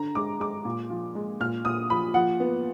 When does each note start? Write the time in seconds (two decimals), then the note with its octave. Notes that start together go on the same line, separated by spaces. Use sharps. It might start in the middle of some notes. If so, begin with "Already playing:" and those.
Already playing: D3 A#5
0.15 G#3 D6
0.40 G#3 D6
0.65 A#2
0.90 F3
1.15 G#3
1.40 A#2 F6
1.65 A#2 D#6
1.90 F3 B5
2.14 F3 F#5
2.40 B3